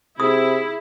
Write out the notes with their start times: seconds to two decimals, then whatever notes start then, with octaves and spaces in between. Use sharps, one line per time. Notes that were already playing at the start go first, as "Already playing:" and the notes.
0.20 C3 E4 G#4 D#6